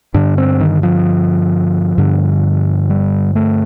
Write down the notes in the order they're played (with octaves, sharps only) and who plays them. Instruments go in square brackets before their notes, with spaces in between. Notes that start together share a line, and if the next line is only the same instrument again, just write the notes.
[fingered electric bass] G2 D3 D4
C4
D#3
F3
G2 D3
G3
A3